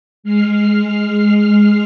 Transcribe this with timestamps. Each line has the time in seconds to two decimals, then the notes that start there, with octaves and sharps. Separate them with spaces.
0.24 G#3 F6 C7